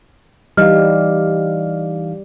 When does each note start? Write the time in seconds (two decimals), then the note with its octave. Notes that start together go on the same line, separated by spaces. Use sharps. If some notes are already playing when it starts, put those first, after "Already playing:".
0.57 E3 G3 D#4 D#5 F5 F6